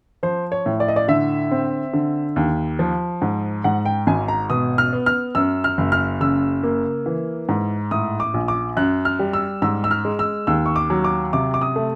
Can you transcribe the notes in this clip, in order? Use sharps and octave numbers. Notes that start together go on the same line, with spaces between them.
F3 C5
C#5
A2
D5
D#5
D5
D3 E5
C4
D3
D#2
F3
G#2
G#2 F#5
G5
G#1 G#5
A#5
B2 D#6
F6
B3
F6
F#2 E6
F6
F#1
F6
C#3 E6
A#3
E3
G#2
A2 D#6
D6
A#1
D6
F#2 F#6
F6
G3
E6
G#2 E6
E6
F6
G#3
E6
D#2 E6
C#6
D6
F#3
D6
C3 D6
D6
D#6
A3